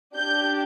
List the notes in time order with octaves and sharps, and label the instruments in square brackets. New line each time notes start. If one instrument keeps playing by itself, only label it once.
[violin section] D4 G4 G6